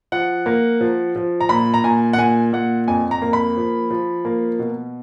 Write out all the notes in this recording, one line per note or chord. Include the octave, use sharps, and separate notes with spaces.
F3 F#5
A#3
F3
F3
A#5
A#2 B5
A#5
A#2 G#5
F#5
A#2 G#5
A#2 F#5
F2 G#5
A#5
A#3
B5
F3
F3
A#3
B2